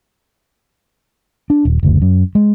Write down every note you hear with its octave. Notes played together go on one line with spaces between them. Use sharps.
D4
D#1
F#1 D2
F#2
G#3